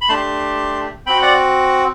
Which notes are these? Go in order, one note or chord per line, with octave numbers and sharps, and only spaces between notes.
B5
A3 D4 G4 A5 C6
C4 F#4 G5 B5
D5 F#5